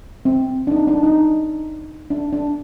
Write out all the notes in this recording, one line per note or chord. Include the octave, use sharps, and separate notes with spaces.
C4
D4
D#4
D4
D#4
D4
D4